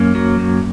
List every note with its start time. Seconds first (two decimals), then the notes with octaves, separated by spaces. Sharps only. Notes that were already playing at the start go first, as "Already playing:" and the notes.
Already playing: F#2 A#3 C#4
0.15 F#3
0.39 F#2